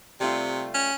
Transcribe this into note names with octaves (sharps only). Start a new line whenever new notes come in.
C3 G3 A3 F4
C#4